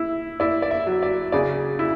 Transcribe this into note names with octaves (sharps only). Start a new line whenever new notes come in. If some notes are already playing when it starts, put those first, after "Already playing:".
Already playing: E4
E4 D5
D5
E5
F#3
D5
C#3 D5
E4